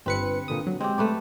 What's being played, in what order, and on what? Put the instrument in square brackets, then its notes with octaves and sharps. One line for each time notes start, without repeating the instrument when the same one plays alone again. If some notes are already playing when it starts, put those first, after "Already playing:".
[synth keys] G1 B4 C#7 [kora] C4
[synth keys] A#2 D3 D#6
F#3
[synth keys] G#3 [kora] C4 G4
[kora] A3 B4 D5